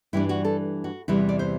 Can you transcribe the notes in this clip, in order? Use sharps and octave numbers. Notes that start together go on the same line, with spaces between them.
G2 E3 G3 D4 E4
F#4
A4
F#4
E2 C3 E3 G3 E4
D5
C5